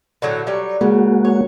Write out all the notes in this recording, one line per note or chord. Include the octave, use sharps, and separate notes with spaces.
A2 D3 F#3
F#3 G3 C#5
C#3 G#3 A#3 F#4
C#5